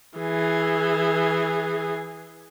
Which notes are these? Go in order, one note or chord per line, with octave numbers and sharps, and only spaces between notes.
E3 G#4